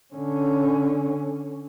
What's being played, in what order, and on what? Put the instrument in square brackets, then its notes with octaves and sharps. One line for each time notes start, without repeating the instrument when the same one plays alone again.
[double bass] D3 C#4